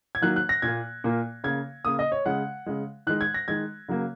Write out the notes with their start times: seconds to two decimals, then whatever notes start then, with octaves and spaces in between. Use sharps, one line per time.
0.15 G#6
0.22 D#3 F#3 A#3 F#6
0.36 F#6
0.49 A#6
0.62 A#2 A#3 G#6
1.04 A#2 A#3
1.44 C#3 A#3 G#6
1.85 C#3 A#3 D#6
1.99 D#5
2.12 C#5
2.26 C#3 G#3 F#5
2.66 C#3 G#3
3.07 D#3 G#3 F#6
3.21 G#6
3.34 A#6
3.48 D#3 G#3 G#6
3.88 C#3 F#3 A#3